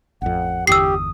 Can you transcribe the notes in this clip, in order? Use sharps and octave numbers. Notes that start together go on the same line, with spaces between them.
A1 F2 F#5
G1 E2 D3 G4 D#6 E6 C7